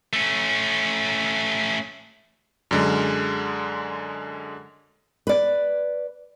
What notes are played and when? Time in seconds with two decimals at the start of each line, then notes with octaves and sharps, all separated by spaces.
0.13 A3 C#4
2.71 F#2 D3 G#3
5.27 B4 D5